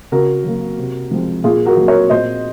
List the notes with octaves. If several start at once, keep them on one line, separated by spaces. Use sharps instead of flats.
C#3 F#4 A#4
F#3 A#3
C3
F3 G#3 C4
A#2 F4 G#4
F#4 A#4
F#3 A#3
A#4 C#5
A#2 C5 D#5